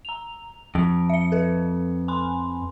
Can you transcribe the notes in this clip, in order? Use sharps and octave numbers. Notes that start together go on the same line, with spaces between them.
A#5 F7
F2 D7
E5 C#7
A4 B4
G#5 B5 C6